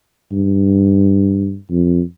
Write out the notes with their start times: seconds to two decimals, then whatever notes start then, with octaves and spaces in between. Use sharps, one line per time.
0.32 G2
1.71 F2